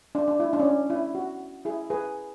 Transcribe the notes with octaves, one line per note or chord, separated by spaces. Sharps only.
D4
D4
E4
D4
C#4
D4
E4
F#4
E4 G#4
G#4 B4